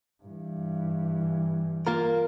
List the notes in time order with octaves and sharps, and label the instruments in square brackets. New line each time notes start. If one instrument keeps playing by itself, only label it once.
[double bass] G2 E3
[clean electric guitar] A#3 F4 A#4